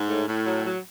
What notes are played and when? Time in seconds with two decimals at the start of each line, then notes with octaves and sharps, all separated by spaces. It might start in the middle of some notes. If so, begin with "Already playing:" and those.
Already playing: G#2
0.10 A2
0.28 A2
0.46 F#3
0.66 F#3